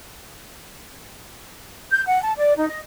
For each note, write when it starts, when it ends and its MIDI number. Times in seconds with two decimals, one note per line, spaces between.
1.91 2.01 91
2.06 2.20 78
2.22 2.32 81
2.37 2.53 74
2.57 2.67 63
2.69 2.79 75